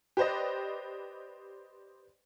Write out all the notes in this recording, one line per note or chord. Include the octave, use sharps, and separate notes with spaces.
G4 B4 C5 D5 D#5